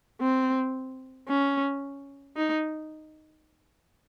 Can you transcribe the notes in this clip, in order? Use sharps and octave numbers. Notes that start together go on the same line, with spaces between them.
C4
C#4
D#4